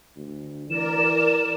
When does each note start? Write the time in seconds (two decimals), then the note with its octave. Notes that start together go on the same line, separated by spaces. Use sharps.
0.16 D2
0.70 E3 A#4 D5 E7